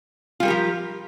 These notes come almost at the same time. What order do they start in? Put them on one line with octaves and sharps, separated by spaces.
F4 G3 A#4 G4 F3